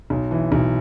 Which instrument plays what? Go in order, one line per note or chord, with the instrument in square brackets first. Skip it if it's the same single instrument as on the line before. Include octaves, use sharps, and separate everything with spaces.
[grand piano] B1
E3
B1